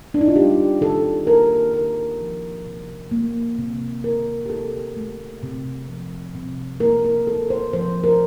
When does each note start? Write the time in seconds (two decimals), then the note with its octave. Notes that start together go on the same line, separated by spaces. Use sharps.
0.14 D4
0.21 D#4
0.28 F4
0.36 G3 G4
0.81 D#3 A4
1.27 A#3 A#4
1.73 D#3 A#4
2.19 F3
2.66 C3
3.11 A#3
3.59 C3
4.04 D#3 A#4
4.46 G4
4.50 C3 A4
4.97 A3
5.43 C3
5.88 F3
6.35 C3
6.80 A#3 A#4
7.05 A#4
7.27 C3 A4
7.50 C5
7.73 F3 C5
8.04 A#4